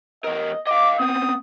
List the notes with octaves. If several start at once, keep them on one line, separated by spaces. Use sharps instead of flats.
E2 A#4 D#5
D#5 F5 D6
B3 C4 D#6